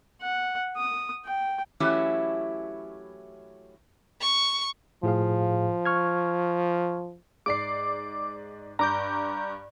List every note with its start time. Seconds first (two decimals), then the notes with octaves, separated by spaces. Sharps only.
0.22 F#5
0.77 D#6
1.26 G5
1.80 E3 F#3 A3 C#4 E4 G4
4.21 C#6
5.03 A2 F3 G#4 F5
5.85 C#6 F6 G#6
7.46 G#2 D5 D6 C7
8.79 G2 A#5 D6 G6